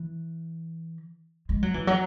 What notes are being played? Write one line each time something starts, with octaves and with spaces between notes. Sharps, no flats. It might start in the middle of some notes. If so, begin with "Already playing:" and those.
Already playing: E3
G#3
F#3
E3
F#3